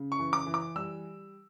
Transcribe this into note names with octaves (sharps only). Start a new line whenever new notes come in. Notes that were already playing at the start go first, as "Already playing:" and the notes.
Already playing: C#3
C#6
E3
D6
E3
D6
G3 E6